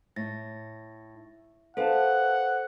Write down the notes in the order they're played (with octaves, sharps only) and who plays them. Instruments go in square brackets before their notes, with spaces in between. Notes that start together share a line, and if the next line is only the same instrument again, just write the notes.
[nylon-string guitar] A2 [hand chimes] A6 A#6
[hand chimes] A4 C5 [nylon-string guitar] B4 F5 A5 [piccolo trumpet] F#5